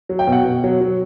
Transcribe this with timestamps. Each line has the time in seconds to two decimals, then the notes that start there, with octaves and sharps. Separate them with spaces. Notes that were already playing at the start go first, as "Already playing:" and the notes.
0.09 F#3
0.19 G5
0.27 B2
0.32 F#5
0.45 B2
0.64 F#3
0.81 F#3